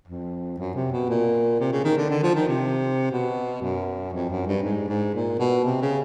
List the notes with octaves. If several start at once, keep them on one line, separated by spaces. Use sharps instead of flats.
F2
F#2
C3
B2
A#2
C3
C#3
D#3
D3
D3
F3
D#3
C3
B2
F#2
F2
F#2
G2
G#2
G#2
A#2
B2
C3
C#3